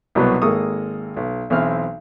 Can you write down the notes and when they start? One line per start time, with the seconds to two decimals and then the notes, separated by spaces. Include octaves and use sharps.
0.15 C2 B2 F#3 B3
0.42 G#1 G#3 A#3 A4 C#6 D#6
1.17 B1
1.50 B1 E3 C4 E4 F6